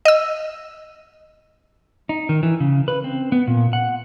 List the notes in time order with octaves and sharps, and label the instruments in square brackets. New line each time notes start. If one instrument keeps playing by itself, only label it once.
[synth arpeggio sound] D#5 E6
[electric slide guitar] D#4
D#3
E3
C#3
B4
C4
B3
A#2
F#5